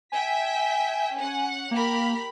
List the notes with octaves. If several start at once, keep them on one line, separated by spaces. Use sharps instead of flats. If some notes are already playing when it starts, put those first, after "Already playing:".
E5 G5 G#5 B6
C#4 F#5
A#3 G4 A#4 B5